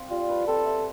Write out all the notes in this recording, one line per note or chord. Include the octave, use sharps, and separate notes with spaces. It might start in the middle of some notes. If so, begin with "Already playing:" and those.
Already playing: C4 F5
G3 F4
B4
C4 A4
E5